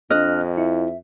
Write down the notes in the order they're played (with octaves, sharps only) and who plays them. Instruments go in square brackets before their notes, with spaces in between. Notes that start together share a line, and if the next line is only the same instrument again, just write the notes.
[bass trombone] F2 [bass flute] D4 [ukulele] D#5 [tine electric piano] F6 F#6
[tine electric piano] E4 [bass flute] E5